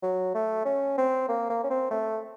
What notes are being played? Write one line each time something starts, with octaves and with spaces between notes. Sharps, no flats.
F#3
A3
C#4
C4
A#3
A#3
C#4
C4
A3